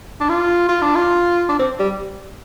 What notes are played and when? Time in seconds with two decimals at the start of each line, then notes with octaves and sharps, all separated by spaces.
0.21 D4
0.29 F4
0.69 F4
0.82 D4
0.95 F4
1.49 D4
1.59 C4
1.79 G3